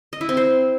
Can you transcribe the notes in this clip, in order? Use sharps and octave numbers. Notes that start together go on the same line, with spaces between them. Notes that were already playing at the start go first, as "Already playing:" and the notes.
D#5
E4
C4
C5